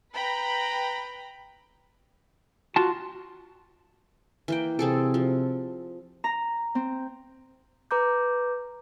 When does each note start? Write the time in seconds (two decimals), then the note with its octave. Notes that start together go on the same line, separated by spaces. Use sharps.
0.14 B4 G5 A#5 B5
2.76 F4 F#4 A5
4.48 E3 A#3 G5
4.79 C3 C4 G#4 A4
5.14 F3
6.24 A#5
6.75 C4
7.91 B4 A#5 D6 G6